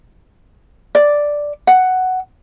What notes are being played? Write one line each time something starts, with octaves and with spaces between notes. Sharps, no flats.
D5
F#5